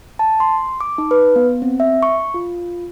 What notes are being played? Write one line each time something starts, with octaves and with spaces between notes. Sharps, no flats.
A5
C6
D6
D#4
B4
B3
C4
E5
C#6
F4